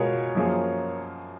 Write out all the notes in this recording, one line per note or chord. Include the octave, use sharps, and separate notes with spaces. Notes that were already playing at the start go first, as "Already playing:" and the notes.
Already playing: B2 G#3 B3 F4 G#4 A#4 C#5
F#2 F3 A#3 F4 G#4